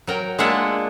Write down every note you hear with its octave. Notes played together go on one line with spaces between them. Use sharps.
F#3 A#4 G5
G#3 A#3 D4 F4 E5 F#5